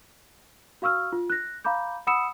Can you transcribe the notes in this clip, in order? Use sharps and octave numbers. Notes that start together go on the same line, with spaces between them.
F#4 F5 C#6 E6 F6
F4
F#6 A#6
F5 A#5 B5 D6 G6
F#5 B5 D#6 E6 C#7 E7